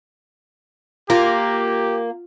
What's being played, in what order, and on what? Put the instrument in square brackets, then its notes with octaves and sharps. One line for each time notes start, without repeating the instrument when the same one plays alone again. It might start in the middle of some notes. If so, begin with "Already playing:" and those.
[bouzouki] A#3 [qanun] F4 [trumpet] G4